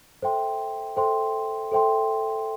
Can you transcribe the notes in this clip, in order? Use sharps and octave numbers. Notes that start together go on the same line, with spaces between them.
A4 C5 E5 G5 C6
A4 C5 E5 G5 C6
A4 C5 E5 G5 C6